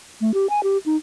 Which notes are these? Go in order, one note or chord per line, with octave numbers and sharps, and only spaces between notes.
A3
G4
G#5
G4
D#4